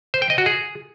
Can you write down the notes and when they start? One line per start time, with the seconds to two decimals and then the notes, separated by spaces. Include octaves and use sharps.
0.14 C5
0.22 G5
0.30 D#5
0.38 F#4
0.46 G#4